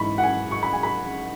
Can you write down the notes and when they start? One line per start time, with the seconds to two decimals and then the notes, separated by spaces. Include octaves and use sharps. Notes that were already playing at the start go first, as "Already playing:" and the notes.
Already playing: G#2 E3 B5 C#6
0.18 F#5
0.23 G#5
0.51 C#6
0.63 B5
0.73 G#5
0.83 B5